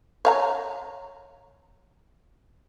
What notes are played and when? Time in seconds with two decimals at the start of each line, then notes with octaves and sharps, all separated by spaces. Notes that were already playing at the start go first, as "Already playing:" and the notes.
0.25 C#5 F5 A#5